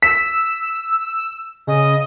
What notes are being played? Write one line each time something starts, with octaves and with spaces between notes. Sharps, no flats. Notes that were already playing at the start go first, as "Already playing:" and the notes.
E6 B6
C#3 D#5